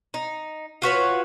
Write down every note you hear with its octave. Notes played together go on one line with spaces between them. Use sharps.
D#4
F4 F#4 B4 C#5